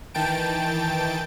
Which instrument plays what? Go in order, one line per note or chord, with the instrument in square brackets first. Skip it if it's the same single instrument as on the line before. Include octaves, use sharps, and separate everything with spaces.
[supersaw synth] D#3 E3 G5 A5 D7